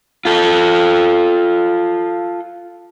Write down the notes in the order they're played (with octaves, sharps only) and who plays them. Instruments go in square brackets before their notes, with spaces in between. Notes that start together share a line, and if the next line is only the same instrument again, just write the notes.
[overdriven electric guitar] F4 A4